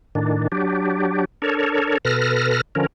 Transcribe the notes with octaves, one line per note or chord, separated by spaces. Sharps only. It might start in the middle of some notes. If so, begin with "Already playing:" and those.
A2 D#3 D4
F#3 D4 G4
D4 A4 A#4 C#5
B2 A4 B4 F6 A#6
D3 F3 C#4 A#4